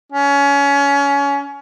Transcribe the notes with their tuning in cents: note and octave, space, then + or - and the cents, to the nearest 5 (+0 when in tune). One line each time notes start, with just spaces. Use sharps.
C#4 +25